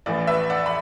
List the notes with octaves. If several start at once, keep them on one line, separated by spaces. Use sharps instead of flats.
A1 A2 E3 D5
B4 E5
D5 F#5
B5